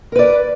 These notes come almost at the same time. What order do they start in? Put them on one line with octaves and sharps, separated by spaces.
A#4 B4 D5